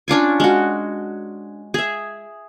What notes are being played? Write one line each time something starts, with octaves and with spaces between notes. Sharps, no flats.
C#4 D4 F4 G#5
G#3 F#4
G#4 E5